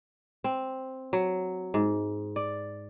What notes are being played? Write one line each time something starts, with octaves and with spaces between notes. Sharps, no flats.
C4
F#3
G#2
D5